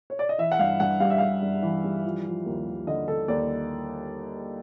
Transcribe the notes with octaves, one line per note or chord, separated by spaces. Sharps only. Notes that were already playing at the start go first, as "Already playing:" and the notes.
C#5
D5
D#5
E3 E5
F#5
G2 F5
G2 F#5
G3 F5
E5
G3 F5
G2
E3
G3
F3
F3
D#2
D#2
D3 D#5
D3 A4
D#2 D5